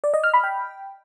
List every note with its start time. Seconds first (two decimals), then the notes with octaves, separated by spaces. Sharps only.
0.04 D5
0.14 D#5
0.24 F6
0.34 B5
0.44 G5